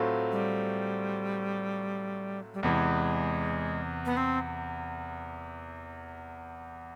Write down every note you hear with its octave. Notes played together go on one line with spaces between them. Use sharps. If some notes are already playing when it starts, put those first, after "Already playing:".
Already playing: A2 F#3 A3 C4 F4
G3
G3
E2 C3 E3 G#3
B3
C4